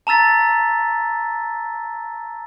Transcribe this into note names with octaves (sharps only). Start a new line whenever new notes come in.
A5 A#5 E6 A6 B6